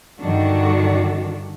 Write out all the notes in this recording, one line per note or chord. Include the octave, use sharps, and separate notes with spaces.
G2 D3 D#3 D4 F#4